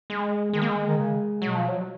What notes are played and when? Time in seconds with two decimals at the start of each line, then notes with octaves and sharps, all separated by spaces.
0.10 G#3
0.53 D#3 G#3
0.62 A#3
0.69 G#3
0.88 D#3
0.98 C#3
1.42 B2 F#3
1.55 F3
1.68 F#3